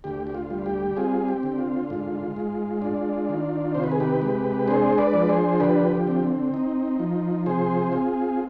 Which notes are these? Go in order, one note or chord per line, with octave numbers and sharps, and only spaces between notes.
D2 G4
G4
F4
G3
G4
C4 F4 G#4
G4
D3
F4
G#2
G#3
D4
D#3
C3 C5
B4
G#4
G4 B4
G#3
D4 G#4 C5
B4 D5
F3
G#4 C5
D3 G4 B4
G4
C4
D#4
F3
C3 G#4 C5
C4 F4 G#4